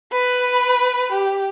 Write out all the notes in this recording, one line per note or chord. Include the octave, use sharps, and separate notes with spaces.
B4 B5
G4